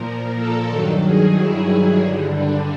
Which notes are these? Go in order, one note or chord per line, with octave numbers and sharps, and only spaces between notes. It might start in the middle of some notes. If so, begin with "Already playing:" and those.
Already playing: A#2 F3 A#4
A4
G2 D#3 F#3 A4
G#4
E4
G2 D3 G3
D4